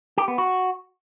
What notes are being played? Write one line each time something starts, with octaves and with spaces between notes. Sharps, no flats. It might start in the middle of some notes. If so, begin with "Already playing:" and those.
G4
B3
F#4